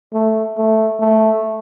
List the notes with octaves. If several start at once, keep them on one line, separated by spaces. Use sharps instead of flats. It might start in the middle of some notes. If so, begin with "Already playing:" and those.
A3
A3
A3